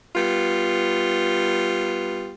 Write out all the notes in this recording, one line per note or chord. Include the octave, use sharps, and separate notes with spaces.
G3 B3 F4